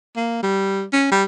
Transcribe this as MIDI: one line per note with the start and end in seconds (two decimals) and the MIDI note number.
0.16 0.42 58
0.43 0.84 55
0.93 1.08 61
1.11 1.24 55